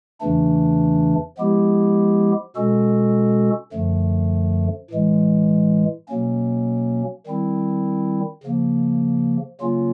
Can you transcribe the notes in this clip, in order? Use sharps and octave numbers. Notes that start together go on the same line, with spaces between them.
E2 C#3 E3 A3 D4
F3 G#3 B3 E4 G4
B2 G#3 C#4 F#4 A4
F#2 D3 F3 A3
A2 E3 G#3
B2 F#3 A#3 C#4
D#3 G3 C4 E4
C#3 F3 A#3
C#3 F#3 A#3 C#4 F4